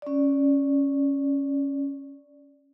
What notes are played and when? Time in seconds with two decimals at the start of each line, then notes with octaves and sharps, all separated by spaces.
0.02 C#4 D5